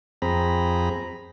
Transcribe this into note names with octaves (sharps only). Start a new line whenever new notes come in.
F2 C4 G#4 A#5 B5